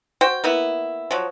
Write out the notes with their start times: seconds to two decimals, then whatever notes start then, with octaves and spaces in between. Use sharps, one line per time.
0.21 F#4 C5 G5
0.44 A#3 B3 E4
1.11 F3 F#3